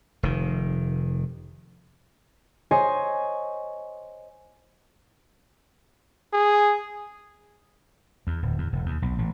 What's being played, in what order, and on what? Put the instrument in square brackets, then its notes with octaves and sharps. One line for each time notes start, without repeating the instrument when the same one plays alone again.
[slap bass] F1 D#3
[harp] C5 C#5 D#5 G#5
[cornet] G#4
[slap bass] E2
D1
E2
E1
D#2
B1
A1